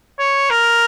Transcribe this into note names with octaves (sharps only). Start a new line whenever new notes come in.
C#5
A#4